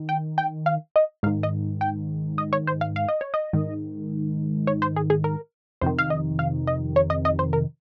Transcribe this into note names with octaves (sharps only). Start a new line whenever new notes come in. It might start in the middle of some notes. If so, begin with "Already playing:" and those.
Already playing: D#3
G5
G5
F5
D#5
G#2 D#3 F5
D#5
G5
D#5
C#5
C5
F5
F5
D#5
C#5
D#5
G#2 D#3
C#5
C5
G#4
G#4
A#4
F2 C3 D#3 C5
F5
D#5
F5
D#5
C#5
D#5
D#5
C5
A#4